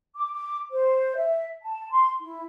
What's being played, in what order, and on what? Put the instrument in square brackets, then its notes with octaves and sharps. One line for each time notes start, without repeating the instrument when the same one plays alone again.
[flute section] D6
D6
C5
E5
A5
C6
E4